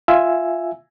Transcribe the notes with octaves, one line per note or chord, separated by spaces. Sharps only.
F4 E5 G#5 E6